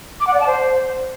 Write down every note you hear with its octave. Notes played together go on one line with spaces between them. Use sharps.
D6
F#5
D5
A5
C5